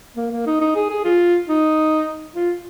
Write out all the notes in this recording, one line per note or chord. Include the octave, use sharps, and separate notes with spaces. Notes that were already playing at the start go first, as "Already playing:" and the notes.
A#3
A#3
D#4
D#4
G#4
G#4
F4
D#4
F4